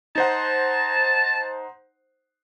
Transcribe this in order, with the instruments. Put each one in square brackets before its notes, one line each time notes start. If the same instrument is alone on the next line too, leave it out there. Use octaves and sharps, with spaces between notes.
[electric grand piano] D#4 C5 F#5 [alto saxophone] A5